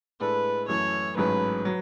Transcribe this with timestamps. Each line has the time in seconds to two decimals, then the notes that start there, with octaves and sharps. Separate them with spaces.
0.20 A2 G#3 D4 A4 B4
0.68 F#2 E3 A3 C#5
1.17 A1 G#2 F#3 A3 C#4 B4
1.65 F#3